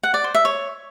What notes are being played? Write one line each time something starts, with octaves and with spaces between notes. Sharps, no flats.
F#5
D5
C5
E5
C#5